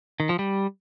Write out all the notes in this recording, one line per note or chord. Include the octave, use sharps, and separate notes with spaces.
D#3
F3
G3